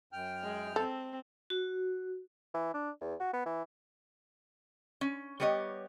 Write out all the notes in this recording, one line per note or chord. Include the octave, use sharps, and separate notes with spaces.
F#2 G5 F6
G#3
C4 A4
F#4
E3
D4
E2
F#4
B3
E3
C#4
G3 B3 G4 C#5 D#5